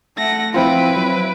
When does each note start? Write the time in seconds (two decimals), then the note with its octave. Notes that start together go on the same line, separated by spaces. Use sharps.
0.17 A3 F#5 A#6
0.54 F3 C4 E4 F4 B4 D7
0.96 F#3